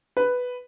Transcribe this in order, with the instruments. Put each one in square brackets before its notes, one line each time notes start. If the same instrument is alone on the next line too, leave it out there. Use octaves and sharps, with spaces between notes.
[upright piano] B4